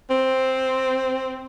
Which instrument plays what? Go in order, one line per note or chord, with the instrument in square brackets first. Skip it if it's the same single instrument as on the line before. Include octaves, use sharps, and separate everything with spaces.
[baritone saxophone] C4